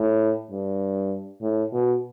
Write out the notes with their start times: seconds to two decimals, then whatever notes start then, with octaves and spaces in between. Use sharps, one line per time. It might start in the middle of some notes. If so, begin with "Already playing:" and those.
Already playing: A2
0.51 G2
1.42 A2
1.72 B2